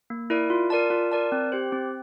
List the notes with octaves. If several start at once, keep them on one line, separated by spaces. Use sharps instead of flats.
A#3
E4 A#4 D5
F4
A#4 D5 A5
F4
A#4 D5 A5
C4
G4 C5
C4